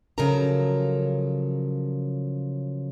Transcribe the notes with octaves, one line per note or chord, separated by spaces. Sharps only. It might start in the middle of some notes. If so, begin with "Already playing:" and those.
C#3 F3 F#3 A4 A#4 A#5